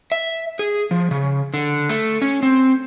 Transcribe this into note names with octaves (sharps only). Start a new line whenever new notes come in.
E5
G#4
F3
C#3
D3
A3
C#4
C4